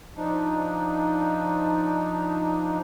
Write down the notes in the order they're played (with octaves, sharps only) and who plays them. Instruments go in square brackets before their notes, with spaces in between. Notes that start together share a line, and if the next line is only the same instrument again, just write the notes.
[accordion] F3 D4 D#4